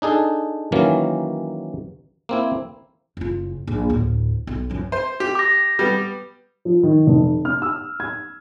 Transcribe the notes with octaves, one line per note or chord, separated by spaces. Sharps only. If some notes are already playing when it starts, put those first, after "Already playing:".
D4 D#4 G#4 A4
D#3 E3 F#3 A#3 C#4
A#3 C4 E4
F#1 F4
A#1
D2 A2
B1
F#2 F3
C5
G4
D6 A#6
G3 B3
F3
D#3
F1
F6
E6
G#6